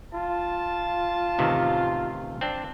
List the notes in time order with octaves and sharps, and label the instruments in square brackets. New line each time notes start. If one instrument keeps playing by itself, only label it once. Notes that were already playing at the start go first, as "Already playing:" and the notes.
[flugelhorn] F4 [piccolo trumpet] A5
[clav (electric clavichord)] A1 C3 D#3
C4 D4